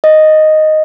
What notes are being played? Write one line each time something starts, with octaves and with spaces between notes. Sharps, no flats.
D#5